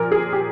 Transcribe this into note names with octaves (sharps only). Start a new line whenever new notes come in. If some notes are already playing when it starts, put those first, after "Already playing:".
Already playing: A#2 F3 A#4
G#4
G4